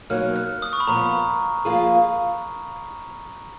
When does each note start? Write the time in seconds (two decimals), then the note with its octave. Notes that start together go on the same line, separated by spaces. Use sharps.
0.10 B2 F#3 A#3 D#4 F6
0.36 F#6
0.62 D#6
0.73 C#6
0.80 B5
0.87 A#2 F3 B3 A#5
1.65 F3 A#3 F4 G#4